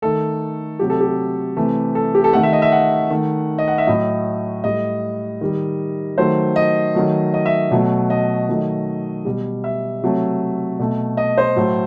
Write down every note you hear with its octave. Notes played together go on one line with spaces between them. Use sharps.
D#3 A3 A4
C3 F#3 A3 G4
A4
G4
C3 E3 A3
A4
G4
A4
D#3 A3 F#5
E5
D#5
E5
F#5
D#3 A3
D#5
F#5
E5
A2 F#3 A3 D#5
A2 G3 D#5
D#3 G3
D#3 F#3 A3 C5
D#5
D#3 F#3 A3
D#5
E5
B2 F#3 A3
D#5
D#3 F#3 A3
B2 G3
E5
C3 F#3 A3
B2 A3
D#5
C5
A2 F#3 A3